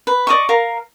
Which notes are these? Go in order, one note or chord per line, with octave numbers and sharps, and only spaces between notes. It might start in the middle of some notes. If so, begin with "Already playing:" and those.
B4
D5 D#5 C#6
A#4 F5